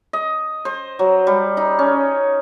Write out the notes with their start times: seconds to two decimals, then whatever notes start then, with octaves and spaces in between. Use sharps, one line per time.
0.13 D#5
0.65 C5
0.99 F#3
1.27 G3
1.57 D#4
1.79 C#4